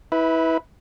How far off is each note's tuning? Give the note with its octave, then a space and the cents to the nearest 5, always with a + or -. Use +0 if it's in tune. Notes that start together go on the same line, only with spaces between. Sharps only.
E4 -25 B4 +0